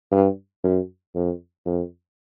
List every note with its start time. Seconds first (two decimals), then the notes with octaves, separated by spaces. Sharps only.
0.12 G2
0.64 F#2
1.15 F2
1.66 F2